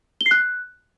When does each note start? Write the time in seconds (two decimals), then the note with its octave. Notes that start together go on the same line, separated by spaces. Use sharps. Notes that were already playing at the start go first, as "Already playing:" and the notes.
0.21 G7
0.26 C7
0.31 F#6